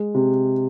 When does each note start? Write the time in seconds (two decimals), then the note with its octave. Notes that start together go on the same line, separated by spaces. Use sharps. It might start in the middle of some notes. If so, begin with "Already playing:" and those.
Already playing: G#3
0.15 C3